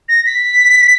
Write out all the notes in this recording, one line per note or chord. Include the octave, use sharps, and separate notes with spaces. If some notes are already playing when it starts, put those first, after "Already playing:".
A#6
B6